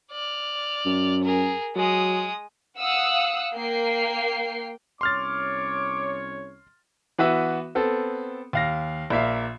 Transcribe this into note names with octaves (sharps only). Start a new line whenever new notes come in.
D5 F6
F#2
G#4 A#4
F#3 G#3 D#6
F5 F#5 D#6 E6 F#6
A#3 G5 C7
C2 C#4 C#5 C6 D6 F6 A6
E3 B3 F#4 B4 E5
B3 C4 A4
D#2 F5 A#6
A#1 A#3 E5 F5